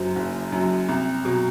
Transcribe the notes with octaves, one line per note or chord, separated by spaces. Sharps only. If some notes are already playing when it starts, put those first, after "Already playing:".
Already playing: F#1 F#2 F#3 C5
F#1
F#2 F#3
C2
B2 F#3